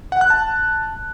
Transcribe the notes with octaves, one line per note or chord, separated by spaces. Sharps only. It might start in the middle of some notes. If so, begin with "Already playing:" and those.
F#5
F#6
A5